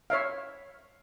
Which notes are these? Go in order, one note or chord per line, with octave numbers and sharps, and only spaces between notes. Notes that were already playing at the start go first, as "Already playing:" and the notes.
C#5 E5 F5